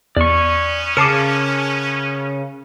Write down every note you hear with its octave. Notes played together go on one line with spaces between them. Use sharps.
E2 B3 C#4 D5 C#6
C#3 A#4 A5 D6 C7 C#7